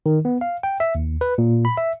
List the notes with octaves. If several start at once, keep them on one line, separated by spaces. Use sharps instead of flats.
D#3
B3
F5
G5
E5
D#2
B4
A#2
B5
E5